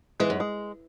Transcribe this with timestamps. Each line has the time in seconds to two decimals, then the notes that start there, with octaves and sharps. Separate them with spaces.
0.20 E3 G#3
0.30 F#2
0.40 G#3